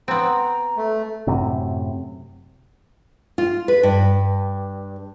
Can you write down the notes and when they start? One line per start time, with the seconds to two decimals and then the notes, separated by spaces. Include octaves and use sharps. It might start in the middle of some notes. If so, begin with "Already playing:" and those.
0.08 B3 C4 A#5
0.77 A3
1.27 F#2 A2 C3
3.38 F4
3.68 B4
3.83 G2